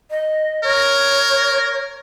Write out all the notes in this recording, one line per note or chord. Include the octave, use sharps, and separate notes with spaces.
D#5
A#4 C#5